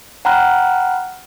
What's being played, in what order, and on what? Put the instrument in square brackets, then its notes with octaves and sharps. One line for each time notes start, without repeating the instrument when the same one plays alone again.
[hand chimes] F#5 G5 A#5 B5 F6 F#6